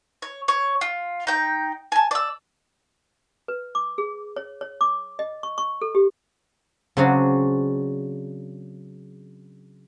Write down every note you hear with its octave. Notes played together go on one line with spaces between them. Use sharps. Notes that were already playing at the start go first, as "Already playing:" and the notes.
C#5
C#5
F4
D#4 G5
G#5 A5
D5 E6
B4
D6
G#4
C#5
C#5
D6
D#5
C#6
C#6
A4
G4
C#3 F#3 C4 D4 F#4 G#4